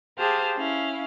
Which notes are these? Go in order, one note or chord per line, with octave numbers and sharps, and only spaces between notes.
G4 G#4 C5 F5 A5
C#4 E4 F5